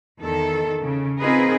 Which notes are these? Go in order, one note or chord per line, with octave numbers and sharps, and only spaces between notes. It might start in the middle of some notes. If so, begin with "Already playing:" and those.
E2 D#3 A4
C#3
C4 D#4 F4 G#4 A#4 B4